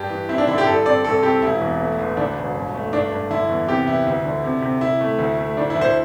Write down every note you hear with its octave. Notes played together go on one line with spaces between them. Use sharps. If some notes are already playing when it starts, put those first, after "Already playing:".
Already playing: G2 G4
E3
C4 E4
D4
D3 E4
G4
G2 A4
C4 D5
C2 A4
C4 G4
E1 E4
E2
A3
A1
D2 D4
E1
G1
A3
G2 D4
G2
D3 E4
E2
C3 G4
E3 E4
D2
D3
C3
C3
C3 E4
A3
D2
A3
D2 D4
E4
D2
C5